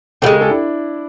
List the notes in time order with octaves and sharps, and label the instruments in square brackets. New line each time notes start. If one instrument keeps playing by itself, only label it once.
[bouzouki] C#3 F3 [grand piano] G4 A4
[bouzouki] G#3
[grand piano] G#4 A#4
G4 A4
D4 E4